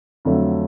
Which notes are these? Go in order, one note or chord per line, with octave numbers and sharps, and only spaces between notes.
F2 D3 F#3 A3